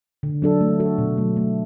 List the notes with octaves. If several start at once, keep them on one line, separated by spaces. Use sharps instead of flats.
D3
F#3 D4 A4
A3
F#4 A4
B2
F#3 A3
A3